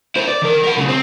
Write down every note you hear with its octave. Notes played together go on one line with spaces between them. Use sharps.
E4 C5
D5
D#3 A#4
A#4 F#5
B1 C#3
C4